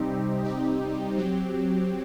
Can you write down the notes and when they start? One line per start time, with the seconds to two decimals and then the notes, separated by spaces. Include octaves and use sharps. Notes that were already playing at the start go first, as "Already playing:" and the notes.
Already playing: C3 G3 C4 D#4 G4
0.45 C3 G3 C4 D#4 G4
1.18 F#3 C4 G4